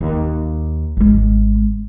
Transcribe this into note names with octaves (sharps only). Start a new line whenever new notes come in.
D#2
G#1 G#3